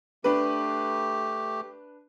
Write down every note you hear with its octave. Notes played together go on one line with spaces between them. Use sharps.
A3 D4 G4 B4